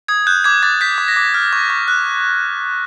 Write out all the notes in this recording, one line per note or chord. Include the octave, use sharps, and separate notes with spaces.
D#6 G#6
F#6 G6
D6 G#6
D6 A6
G6 B6
D6
A#6
D6
F6
C#6
C#6
F#6